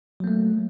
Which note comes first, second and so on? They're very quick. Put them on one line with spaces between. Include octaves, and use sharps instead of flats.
F#3 A#3 A3